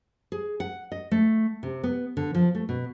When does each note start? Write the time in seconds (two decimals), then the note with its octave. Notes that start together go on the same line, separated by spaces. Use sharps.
0.32 G#4
0.60 F#5
0.92 D#5
1.11 A3
1.63 C3
1.84 B3
2.17 D3
2.35 F3
2.55 A3
2.69 B2